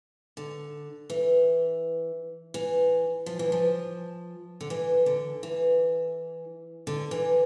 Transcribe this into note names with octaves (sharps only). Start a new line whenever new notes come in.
D3
E3
E3
F3
E3
F3
D3
E3
D3
E3
D3
E3